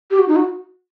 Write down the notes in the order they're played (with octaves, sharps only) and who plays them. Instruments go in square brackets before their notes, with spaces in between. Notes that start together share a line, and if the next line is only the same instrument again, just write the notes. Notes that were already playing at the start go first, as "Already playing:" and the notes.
[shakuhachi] G4
F#4
D#4
F#4